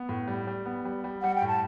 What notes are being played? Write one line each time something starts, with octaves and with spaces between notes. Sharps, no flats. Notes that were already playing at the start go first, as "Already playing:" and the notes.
Already playing: B3
A2
G3
G3
B3
G3
G3
G3 F#5
G5
A2
A5